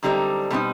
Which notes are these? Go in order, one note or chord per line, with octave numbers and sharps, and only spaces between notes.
F#2 D3 G3 C4 D#4
B2 G3 C4 D#4